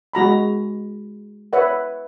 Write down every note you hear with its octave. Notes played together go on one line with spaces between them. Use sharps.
G#3 F#4 A#5 B5
B4 C#5 E5 F#5